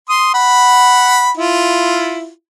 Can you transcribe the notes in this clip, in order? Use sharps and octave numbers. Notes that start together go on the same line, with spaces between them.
C6 D#6
F#5 B5
E4 F4